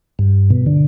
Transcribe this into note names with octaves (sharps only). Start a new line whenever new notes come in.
G2
B2
D3